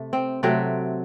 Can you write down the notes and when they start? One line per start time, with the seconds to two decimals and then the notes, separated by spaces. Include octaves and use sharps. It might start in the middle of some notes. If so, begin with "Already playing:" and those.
Already playing: C3 A3
0.13 C4
0.43 C3 F#3 A3 C4